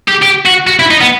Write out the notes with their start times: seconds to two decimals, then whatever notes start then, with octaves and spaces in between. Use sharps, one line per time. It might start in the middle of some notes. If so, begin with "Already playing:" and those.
0.08 G4
0.23 G4
0.46 F#4
0.67 F#4
0.79 E4
0.91 D#4
1.01 B3